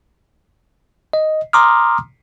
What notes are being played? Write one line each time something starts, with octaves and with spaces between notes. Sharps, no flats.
D#5
A#5 C6 D6 D#6 F6